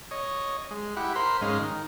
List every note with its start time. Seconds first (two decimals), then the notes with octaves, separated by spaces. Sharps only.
0.11 C#5 D#5
0.71 G#3
0.97 E4 G4 F#5 B5
1.16 A#4 C5 B5 C6
1.42 G#2 G#3 C#4 D#5 F5
1.61 D#3